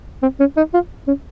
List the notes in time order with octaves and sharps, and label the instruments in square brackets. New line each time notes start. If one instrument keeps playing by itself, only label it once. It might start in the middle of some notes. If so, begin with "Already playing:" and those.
[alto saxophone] C4
C#4
D#4
F4
C#4